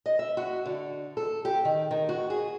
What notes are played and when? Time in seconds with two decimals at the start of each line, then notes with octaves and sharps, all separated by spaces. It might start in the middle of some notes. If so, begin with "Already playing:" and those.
0.06 D#5
0.19 E5
0.37 F#4
0.66 D3
1.17 A4
1.45 G4
1.65 D#3
1.91 D#3
2.09 F#4
2.30 G#4